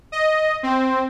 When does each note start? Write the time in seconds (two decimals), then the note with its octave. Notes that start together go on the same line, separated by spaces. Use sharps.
0.12 D#5
0.63 C4